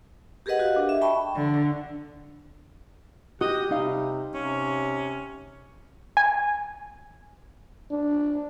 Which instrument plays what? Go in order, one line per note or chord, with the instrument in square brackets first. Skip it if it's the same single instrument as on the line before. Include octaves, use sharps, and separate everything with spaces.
[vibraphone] G4 G#4 A#4 B4 D#5 F#5
F#4 G4 D#5 F5
D4
E5
G5 A5 B5 C#6
[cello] D3
[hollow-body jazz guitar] F#4 [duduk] G4 [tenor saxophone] D#5
[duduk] C3 [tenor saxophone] G3 [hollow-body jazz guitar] D#4 F5
[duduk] C3 [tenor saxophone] C#4
[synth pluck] G#5
[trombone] D4